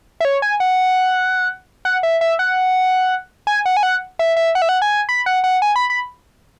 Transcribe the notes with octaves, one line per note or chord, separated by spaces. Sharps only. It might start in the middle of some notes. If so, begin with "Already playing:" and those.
E5
C#5
G#5
F#5
F#5
E5
E5
F#5
G#5
F#5
G#5
F#5
E5
E5
F#5
E5
F#5
G#5
B5
F#5
F#5
G#5
B5
B5